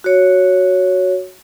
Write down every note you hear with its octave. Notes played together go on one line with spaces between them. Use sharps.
F#4 C#5